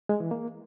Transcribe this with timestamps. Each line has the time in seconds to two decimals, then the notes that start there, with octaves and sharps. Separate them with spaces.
0.09 G#3
0.20 E3
0.31 A#3